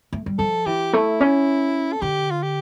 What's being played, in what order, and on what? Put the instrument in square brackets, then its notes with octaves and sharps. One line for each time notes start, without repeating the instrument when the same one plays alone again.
[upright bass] A3
G3
[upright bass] F3 [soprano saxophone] A4
[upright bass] E3 [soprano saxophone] G4
[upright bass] A3 [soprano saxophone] E4
[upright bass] C#4
[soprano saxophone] A4
[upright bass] D3 [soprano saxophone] G4
[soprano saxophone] F4
G4